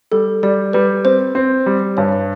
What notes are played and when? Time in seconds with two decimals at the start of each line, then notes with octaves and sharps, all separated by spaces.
0.12 G3 A4
0.43 G3 D5
0.73 G3 B4
1.05 C4 C5
1.35 C4
1.66 G3
1.97 G2 C#5